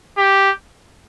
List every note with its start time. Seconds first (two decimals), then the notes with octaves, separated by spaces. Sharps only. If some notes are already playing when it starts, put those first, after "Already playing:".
0.17 G4